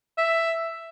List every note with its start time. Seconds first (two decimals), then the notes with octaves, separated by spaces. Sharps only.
0.18 E5